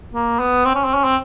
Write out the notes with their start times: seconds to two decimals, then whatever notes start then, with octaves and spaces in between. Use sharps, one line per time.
0.13 A#3
0.39 B3
0.65 C4
0.75 C#4
0.85 C4
0.94 C#4
1.04 C4